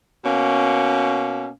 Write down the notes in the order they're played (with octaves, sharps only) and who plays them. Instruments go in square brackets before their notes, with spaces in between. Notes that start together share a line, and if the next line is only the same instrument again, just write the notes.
[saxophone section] B2 A#3 C#4